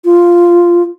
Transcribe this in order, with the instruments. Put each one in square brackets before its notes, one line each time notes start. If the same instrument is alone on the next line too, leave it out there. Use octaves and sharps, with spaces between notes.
[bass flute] F4